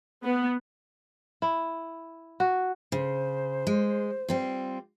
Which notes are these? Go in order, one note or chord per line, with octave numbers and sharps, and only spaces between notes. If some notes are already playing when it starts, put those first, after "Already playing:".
B3
E4
F#4
C#3 C5
G#3
G3 C4 F4